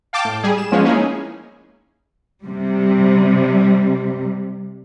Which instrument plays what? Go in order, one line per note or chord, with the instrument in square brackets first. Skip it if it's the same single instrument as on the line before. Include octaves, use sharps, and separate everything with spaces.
[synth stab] F5 G5 A5 D6
A2
G3 G#4
E7
F3 G#3 B3 C#4 F4
A#3 C#4 D#4 E4 G#4
[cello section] C3 G3